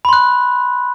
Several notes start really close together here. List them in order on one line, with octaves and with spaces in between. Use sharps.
B5 C6 F#6